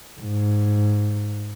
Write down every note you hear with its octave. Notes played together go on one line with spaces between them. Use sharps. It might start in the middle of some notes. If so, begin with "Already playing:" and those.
G#2